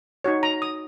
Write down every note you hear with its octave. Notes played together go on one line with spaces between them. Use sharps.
D#4 F#4 C#5
A#5
D#6